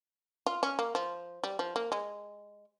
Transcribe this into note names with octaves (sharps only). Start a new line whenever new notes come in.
F4
C#4
A#3
F3
G3
F3
A#3
G#3